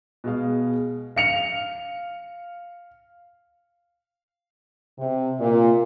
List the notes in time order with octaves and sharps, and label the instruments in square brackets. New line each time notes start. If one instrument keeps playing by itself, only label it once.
[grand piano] B2 G#3 F5
F5 C#7 F7
[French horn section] C3
A#2